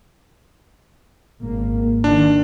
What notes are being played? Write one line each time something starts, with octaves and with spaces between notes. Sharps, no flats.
G#1 A#3
D#3 D4